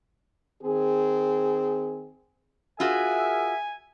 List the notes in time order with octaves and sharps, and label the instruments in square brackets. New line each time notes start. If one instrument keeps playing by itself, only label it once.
[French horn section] D#3 C4 G#4
[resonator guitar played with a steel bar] F4 F#4 [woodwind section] G#4 A#4 E5 [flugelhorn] G#5